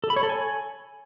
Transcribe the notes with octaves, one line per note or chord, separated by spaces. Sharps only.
A4
B5
C#5
A4
G#5